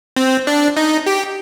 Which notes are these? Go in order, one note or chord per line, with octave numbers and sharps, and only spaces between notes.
C4
D4
D#4
G4